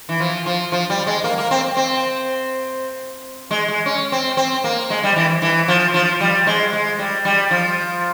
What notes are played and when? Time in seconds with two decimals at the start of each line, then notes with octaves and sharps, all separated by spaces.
0.09 E3
0.20 F3
0.46 F3
0.72 F3
0.90 G3
1.07 G#3
1.24 A#3
1.38 A#3
1.51 C4
1.77 C4
3.51 G#3
3.68 G#3
3.86 C#4
4.12 C4
4.37 C4
4.64 A#3
4.90 G#3
5.03 G3
5.16 E3
5.42 E3
5.68 F3
5.94 F3
6.20 G3
6.47 G#3
6.73 G#3
6.99 G3
7.25 G3
7.51 F3